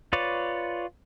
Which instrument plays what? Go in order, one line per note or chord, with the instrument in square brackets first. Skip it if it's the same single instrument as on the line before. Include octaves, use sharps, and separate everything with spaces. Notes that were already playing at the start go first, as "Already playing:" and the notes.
[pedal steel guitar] F4 B4 C#5 D5